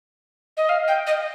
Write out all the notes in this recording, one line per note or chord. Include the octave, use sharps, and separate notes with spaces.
D#5
F5
G5
D#5